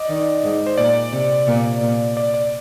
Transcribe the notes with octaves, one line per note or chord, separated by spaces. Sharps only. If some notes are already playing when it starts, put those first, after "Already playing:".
Already playing: D5 D#5
D#3
G#2
C5
A#2 D5
C3
A#2
A#2
D5
D5